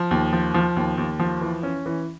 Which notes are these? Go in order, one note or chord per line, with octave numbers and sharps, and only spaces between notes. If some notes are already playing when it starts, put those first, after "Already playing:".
Already playing: F3
D#2
F3
F3
D#2
D#2
F3
E3
C#4
E3